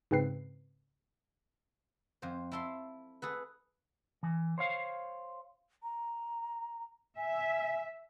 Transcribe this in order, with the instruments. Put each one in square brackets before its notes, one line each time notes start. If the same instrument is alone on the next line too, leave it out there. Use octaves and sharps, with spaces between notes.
[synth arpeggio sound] G#2 C#3 C4 B4 C7
[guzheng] F2 C5
E4 A4 C6
G#4 A4 B4
[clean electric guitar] E3
C5 C#5 F5
[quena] A#5
[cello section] E5 [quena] G#5